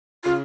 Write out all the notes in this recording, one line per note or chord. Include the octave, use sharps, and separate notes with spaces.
C#3 F4